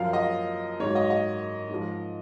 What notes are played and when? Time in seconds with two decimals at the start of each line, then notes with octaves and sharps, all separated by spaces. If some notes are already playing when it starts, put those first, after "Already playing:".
Already playing: F#2 F3 F5
0.13 D#5
0.80 G#2 F#3 C#5
0.95 D#5
1.10 D#5
1.69 G#2 F3